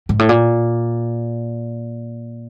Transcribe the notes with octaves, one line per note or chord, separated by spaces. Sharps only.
G#2
A2
A#2